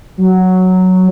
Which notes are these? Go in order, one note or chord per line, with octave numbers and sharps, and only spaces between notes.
F#3